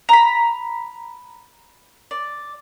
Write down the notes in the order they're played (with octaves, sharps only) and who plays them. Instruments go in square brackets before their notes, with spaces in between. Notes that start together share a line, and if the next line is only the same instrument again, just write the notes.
[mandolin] A#5 B5
D5